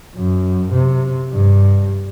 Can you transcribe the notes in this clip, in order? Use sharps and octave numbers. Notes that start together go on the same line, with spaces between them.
F#2
C3
G2